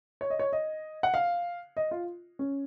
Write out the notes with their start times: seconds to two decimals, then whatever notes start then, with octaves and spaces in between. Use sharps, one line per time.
0.21 C#5
0.30 D#5
0.39 C#5
0.53 D#5
1.03 F#5
1.14 F5
1.77 D#5
1.91 F4
2.39 C#4